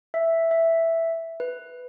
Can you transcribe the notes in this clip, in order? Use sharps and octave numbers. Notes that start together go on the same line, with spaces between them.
E5
E5
B4